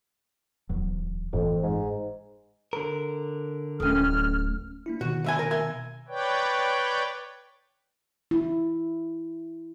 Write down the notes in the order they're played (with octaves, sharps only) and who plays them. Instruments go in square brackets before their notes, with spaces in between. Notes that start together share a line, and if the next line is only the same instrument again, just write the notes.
[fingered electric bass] D1 E2 F#3
[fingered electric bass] F#1 A2 E3 [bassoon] F2
[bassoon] G#2
[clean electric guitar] D3 A#4
[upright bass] D1 A3 [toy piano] C#4 A4 [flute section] F6
[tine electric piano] A#3 D4 E4
[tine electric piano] B2 D#3 [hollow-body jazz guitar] F#4
[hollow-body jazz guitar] C2 E5 G#5
A#4
E5 G#5
[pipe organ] B4 C#5 D5 G5
[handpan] E4